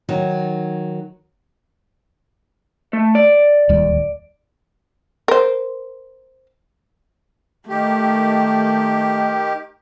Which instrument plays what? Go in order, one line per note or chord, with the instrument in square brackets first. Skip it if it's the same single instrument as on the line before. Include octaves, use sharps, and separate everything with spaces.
[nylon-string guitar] D#3 F#3 D#4
[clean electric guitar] A3
D5
[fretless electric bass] D1 D#2 G3
[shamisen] A#4 C5
[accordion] D#3 G4 [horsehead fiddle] A3